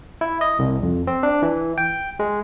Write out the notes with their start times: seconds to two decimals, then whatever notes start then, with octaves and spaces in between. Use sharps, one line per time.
0.21 E4
0.41 D#5
0.59 C2
0.83 F2
1.07 C4
1.23 D4
1.43 E3
1.78 G5
2.19 G#3